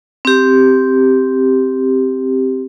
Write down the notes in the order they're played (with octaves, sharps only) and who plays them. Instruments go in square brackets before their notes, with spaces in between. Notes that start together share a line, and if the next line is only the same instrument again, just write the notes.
[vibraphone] C4 G4